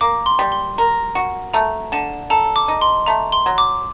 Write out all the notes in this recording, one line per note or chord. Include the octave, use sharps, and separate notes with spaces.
A#3 D6
C6
G3
C6
A#4
F#4
A3 A#5
D3 A5
A4 A#5
D6
D#4
C6
A3 A#5
C6
F#3
D6